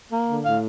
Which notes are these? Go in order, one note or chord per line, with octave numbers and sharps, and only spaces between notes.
A#3
D3
A2 F5